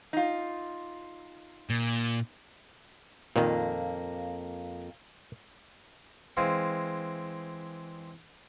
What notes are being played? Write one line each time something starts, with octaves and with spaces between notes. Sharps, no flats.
D#4 F4
A#2
F2 A#2 D#3 A#3
E3 G#3 C4 F5